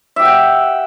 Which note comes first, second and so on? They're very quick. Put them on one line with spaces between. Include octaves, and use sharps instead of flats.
E5 G4 F#5 G5